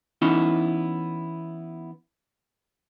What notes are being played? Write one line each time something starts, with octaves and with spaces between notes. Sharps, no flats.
E3 B3 C#4 D#4 E4